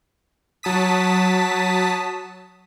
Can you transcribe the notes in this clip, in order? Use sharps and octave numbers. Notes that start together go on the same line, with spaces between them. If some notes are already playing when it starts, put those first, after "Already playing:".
F#3 A5 D#6 B6